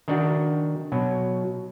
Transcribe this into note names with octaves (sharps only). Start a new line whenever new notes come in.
D#3 D4 F#4
B2 F#3